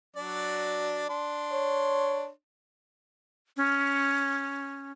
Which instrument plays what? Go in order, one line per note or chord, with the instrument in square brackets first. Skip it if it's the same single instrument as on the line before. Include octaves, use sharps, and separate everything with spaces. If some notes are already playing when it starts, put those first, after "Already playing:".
[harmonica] F#3 D4 D5
D4 C6
[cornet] C#5
[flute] C#4